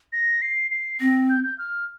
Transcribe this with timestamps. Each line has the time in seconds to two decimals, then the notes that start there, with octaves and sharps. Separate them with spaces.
0.13 A#6
0.42 C7
0.71 C7
1.00 C4 A#6
1.30 G6
1.44 G6
1.58 F6